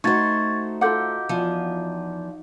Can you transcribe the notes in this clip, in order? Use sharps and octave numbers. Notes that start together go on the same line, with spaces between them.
A3 D#4 F#4 C5 C#6 G#6 A6
F4 A4 F5 F#5 D6 G6
E2 F3